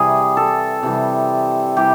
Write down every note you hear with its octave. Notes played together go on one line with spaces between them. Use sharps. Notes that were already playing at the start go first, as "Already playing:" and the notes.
Already playing: C3 E3 G3 G#4
A4
C3 E3 G3
C3 E3 G3 G4